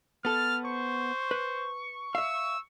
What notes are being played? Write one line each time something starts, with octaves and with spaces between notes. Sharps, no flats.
B3 A4 F6 A6
C5 C#6
B4
E5 F5 E6